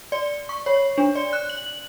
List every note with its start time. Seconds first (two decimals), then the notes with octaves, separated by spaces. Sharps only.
0.12 D5
0.49 C#6
0.66 C#5
0.98 D4
1.15 D5
1.33 F#6
1.49 F#7